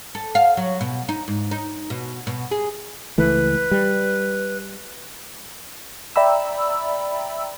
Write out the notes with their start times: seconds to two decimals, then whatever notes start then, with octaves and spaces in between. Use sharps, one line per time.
0.15 A4
0.35 F5
0.57 F#3
0.81 B2
1.09 D#4
1.28 G#2
1.51 D#4
1.90 B2
2.27 B2
2.51 G#4
3.18 C#2 E3 A3 B4
3.71 G3
6.16 D5 E5 G5 A#5 B5 E6